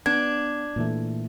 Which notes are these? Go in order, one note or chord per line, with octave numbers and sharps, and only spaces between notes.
B3 D4 G#6
A#2 E3 A3